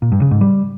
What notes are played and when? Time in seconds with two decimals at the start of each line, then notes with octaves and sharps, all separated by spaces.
0.02 A#2
0.12 G2
0.22 C#3
0.31 G#2
0.41 G3